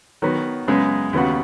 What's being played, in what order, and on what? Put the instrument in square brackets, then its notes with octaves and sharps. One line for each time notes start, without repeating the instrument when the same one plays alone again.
[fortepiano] D#3 F#3 B3
F#2 C#3 G#3 B3 G#4
D#2 C#3 B3 F#4